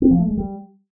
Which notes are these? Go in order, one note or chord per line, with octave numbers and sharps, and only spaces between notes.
C4
F3
A3
G#3
G3